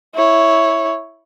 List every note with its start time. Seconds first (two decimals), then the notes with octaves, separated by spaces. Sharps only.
0.15 E4 C#5